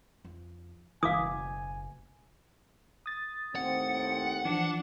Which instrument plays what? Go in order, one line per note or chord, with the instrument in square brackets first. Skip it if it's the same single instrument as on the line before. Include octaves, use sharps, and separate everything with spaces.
[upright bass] F2
[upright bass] F#1 B2 [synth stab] E3 [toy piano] F5 D6 D#6 [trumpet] G#5
[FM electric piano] D#6 A6
[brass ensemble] D#2 A2 C4 [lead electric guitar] F#5
[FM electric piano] E3 F3 [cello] D4